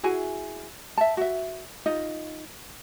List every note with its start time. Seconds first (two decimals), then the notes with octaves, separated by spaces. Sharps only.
0.03 E4 F#4 G#4 G#5
0.98 E5 A5
1.17 F#4 E5
1.86 D#4 F4 D#5